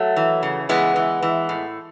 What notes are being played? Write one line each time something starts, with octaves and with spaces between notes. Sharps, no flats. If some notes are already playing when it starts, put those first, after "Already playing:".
Already playing: F#3 A3
E3
C#3
E3 G#3 B3
E3
E3
A2